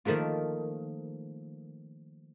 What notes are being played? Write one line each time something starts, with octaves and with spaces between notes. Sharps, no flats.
D#3 F3 A3 A#3 F4